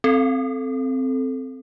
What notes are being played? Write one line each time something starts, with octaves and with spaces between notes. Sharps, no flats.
C4 A4